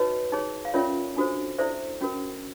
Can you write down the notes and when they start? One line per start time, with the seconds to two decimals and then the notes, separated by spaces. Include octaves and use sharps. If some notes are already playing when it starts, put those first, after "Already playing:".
Already playing: D#4 F#4 B4 C#5 D#5
0.32 D#4 G#4 C#5
0.65 F5
0.74 C#4 F4 A#4 C#5 D5 E5
1.17 D4 F#4 A4 C5
1.59 E4 A4 C5 D5 E5
2.01 C#4 F#4 A#4